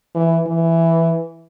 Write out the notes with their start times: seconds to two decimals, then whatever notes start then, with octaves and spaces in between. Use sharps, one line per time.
0.15 E3
0.47 E3